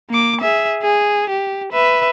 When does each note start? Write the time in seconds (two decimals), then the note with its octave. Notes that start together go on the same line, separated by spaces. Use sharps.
0.10 A#3 D6
0.41 G#4 E5
0.83 G#4
1.30 G4
1.73 B4 E5